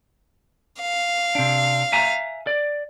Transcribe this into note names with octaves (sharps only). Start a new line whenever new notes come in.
F5
C3 D4
E5 G#5 A#5
D5